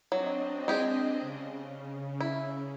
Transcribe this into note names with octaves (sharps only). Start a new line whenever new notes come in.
F#3 C4 D4 D#5
G#3 G4 G#4
C#3
E4